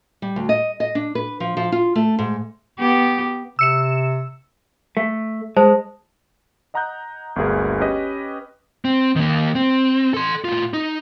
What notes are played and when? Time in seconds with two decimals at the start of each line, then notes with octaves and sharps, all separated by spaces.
0.22 G3
0.36 D2
0.49 D#5
0.80 D#5
0.95 D4
1.15 B4
1.40 F3
1.57 F3
1.72 F4
1.95 A3
2.19 G#2
2.78 B3 G4
3.59 C3 E6 C#7 E7
4.97 A3
5.57 G#3 C5 A5
6.74 D#5 F#5 A#5 D#6 F#6 G6
7.36 G1 D2 A#3 F#4 G#4 A#4
7.80 C#4 G4 B4 D#5
8.85 C4
9.16 D#3 A#3
9.55 C4
10.14 A4 C6
10.44 A2 F4
10.73 D#4